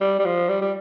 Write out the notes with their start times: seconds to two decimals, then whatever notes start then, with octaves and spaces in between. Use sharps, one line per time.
0.01 G3
0.20 G3
0.25 F3
0.49 G3
0.62 G3